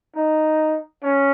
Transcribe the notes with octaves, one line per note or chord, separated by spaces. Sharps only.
D#4
C#4